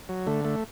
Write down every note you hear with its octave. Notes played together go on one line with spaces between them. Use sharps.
F#3
D3 A3
A3